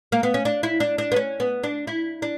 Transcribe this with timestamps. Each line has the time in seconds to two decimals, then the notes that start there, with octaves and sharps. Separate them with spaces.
0.12 A#3
0.23 B3
0.34 C#4
0.45 D4
0.63 E4
0.80 D4
0.98 D4
1.12 B3
1.16 C#4
1.40 B3
1.63 D4
1.87 E4
2.22 D4